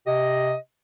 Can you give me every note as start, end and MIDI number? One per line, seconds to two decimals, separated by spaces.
0.07 0.55 48
0.07 0.55 67
0.07 0.55 75